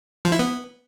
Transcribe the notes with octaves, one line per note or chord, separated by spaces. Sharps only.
F3
E4
B3